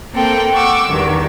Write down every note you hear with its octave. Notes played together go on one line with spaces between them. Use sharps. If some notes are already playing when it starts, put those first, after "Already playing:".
A#3 C4 A4 G5
F#5 C#6 D6 E6
E2 G2 D#3